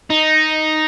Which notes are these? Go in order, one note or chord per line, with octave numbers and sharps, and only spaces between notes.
D#4